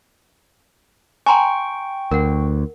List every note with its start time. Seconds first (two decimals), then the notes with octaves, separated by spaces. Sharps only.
1.26 G5 G#5 A#5 C6 C#6
2.11 D2 A#4 F#5